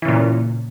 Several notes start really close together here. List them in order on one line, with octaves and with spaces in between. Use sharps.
E3 C#3 A#2